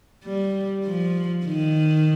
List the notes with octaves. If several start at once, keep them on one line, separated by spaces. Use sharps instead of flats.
G3
F3
D#3